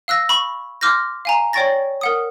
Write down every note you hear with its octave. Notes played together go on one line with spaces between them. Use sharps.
F5 E6 F#6 A#6
B5 C#6
C6 D6 F6 G6 A#6
F5 G#5 A#5
C#5 D5 G5 C#6 A6 A#6
A#4 F#5 D#6